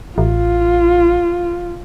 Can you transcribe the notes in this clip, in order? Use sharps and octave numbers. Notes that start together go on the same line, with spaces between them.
A1 F4